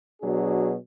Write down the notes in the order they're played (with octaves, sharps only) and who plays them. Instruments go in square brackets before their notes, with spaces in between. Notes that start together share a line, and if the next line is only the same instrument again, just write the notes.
[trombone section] B2 F#3 D4 G#4